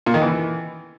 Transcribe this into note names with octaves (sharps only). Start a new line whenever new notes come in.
A#2
D#3
E3